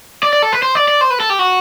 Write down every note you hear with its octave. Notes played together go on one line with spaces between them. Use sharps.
D5
D5
A4
B4
C5
D5
D5
C5
B4
A4
G4
F#4